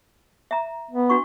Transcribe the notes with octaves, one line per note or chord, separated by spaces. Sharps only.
E5 A#5
B3
D4 F#4 C#6